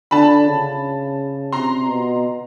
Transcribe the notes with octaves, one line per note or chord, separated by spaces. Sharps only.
D3 A5 B5
C#3
C3 A#5 C6
B2